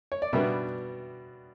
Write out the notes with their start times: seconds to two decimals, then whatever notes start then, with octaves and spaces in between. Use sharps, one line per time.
0.12 C#5
0.22 D5
0.33 B2 G3 B3 D4 E5